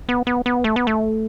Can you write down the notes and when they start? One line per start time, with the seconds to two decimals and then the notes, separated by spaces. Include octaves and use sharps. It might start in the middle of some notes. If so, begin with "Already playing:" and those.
0.09 B3
0.27 B3
0.46 B3
0.64 A3
0.76 B3
0.87 A3